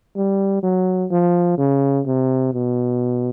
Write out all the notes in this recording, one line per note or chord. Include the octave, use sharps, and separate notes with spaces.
G3
F#3
F3
C#3
C3
B2